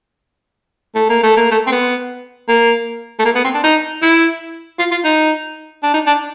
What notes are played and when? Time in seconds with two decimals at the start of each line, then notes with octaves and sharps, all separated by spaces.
0.95 A3
1.09 A#3
1.23 A3
1.37 A#3
1.51 A3
1.67 C4
1.72 B3
2.49 A#3
3.19 A3
3.25 A#3
3.35 B3
3.44 C4
3.55 D4
3.64 D#4
4.02 E4
4.79 F4
4.91 F4
5.04 D#4
5.83 D4
5.94 D#4
6.07 D4